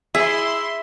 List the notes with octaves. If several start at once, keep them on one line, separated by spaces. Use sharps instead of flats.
E4 G#4 E5 C6